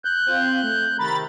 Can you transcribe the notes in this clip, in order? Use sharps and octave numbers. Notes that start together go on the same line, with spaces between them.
F#6 G6
C4 F4
A3
C3 D#3 A#5 B5 A6